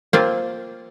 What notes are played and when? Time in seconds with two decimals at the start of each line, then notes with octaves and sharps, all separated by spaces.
0.13 A#3 C4 F4